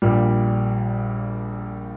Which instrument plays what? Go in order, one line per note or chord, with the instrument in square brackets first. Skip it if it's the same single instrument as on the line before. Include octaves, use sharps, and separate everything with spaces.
[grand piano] A#1 A#2 G3